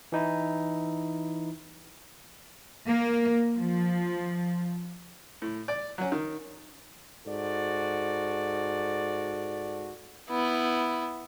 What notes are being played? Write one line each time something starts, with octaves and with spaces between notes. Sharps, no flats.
E3 D#4 E4
A#3
F3
A2
D5
F#3 C#4
D#3
G#2 F#4 A4 D5
B3 E4